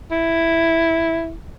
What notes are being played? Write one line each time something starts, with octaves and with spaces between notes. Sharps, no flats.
E4